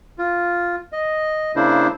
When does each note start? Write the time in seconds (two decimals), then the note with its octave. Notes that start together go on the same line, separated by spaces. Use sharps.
0.19 F4
0.93 D#5
1.56 C#3 A#3 D4 E4 C5